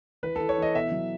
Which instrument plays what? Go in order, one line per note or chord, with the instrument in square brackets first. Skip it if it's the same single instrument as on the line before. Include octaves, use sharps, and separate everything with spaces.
[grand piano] E3 B4
A4
E3
C#5
E3 D#5
B2 E5
F#3